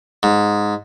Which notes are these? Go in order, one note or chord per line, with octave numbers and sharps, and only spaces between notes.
G#2